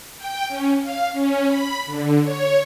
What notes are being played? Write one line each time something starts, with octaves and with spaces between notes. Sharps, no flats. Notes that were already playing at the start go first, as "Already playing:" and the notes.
G5
C#4
F5
C#4
B5
D3
C#5